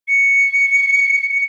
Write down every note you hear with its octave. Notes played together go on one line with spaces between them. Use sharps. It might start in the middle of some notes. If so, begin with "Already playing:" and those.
C#7